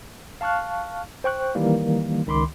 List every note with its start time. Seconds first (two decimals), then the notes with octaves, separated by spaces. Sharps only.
0.41 F5 A5 C#6 F6 F#6
1.24 C5 G5 C#6 F#6
1.55 D#3 E3 G3 A#3
2.27 C#2 D#3 B5 C6 D6